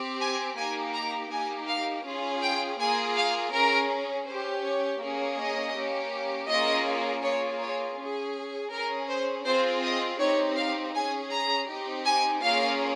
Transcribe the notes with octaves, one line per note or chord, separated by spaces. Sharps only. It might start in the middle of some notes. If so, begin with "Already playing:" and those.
Already playing: C4 G4
G#5
A#3 D#4 G4 G#5
A#5
A#3 D#4 G4 G#5
F5
C#4 F4 G#4
G5
A#3 F4 G#4 G#5
F5
C#4 G#4 A#4
C#4 G4 C5
C#5
A#3 C#4 G#4
D#5
A#3 C#4 G4
A#3 C#4 F4 G#4 D#5
A#3 F4 G#4 C#5
C#5
C#4 G#4
C#4 G#4 A#4
C5
C4 F4 G#4 C5
D#5
C4 D#4 G4 C#5
F5
C#4 G#4 G#5
A#5
C4 D#4 G4
G#5
A#3 C#4 F4 G#4 F5